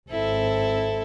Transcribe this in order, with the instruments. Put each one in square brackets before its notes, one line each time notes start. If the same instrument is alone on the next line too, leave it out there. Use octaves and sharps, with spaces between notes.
[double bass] G#1 C4 [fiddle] E4 A4